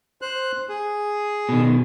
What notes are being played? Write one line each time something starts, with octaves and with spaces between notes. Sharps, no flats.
C5 F#6
G#4
B2 D#3